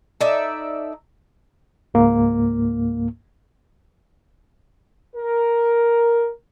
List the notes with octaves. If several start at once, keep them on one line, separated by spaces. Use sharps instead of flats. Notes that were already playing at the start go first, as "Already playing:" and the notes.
D#4 A4 D5 E5
C#2 G#2 A#3
A#4